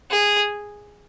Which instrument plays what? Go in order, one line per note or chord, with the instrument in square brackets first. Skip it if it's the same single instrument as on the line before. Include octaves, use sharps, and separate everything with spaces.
[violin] G#4